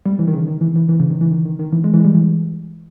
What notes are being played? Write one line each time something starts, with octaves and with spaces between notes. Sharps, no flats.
G3
E3
D#3
C#3
D#3
E3
E3
E3
C#3
D#3
E3
D#3
D#3
D#3
E3
G#3
E3
G#3
G3
E3